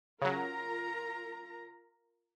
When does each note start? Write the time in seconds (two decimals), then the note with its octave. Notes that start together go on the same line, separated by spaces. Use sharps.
0.22 C#3 F#3 F4 A#4 A#5